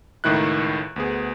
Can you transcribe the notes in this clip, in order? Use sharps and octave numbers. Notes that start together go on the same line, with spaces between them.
C#2 A2 D#3 E4 F#6
D2 B3 G#4